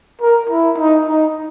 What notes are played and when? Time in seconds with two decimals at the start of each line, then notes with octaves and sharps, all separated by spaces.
0.21 A#4
0.49 E4
0.78 D#4
1.06 D#4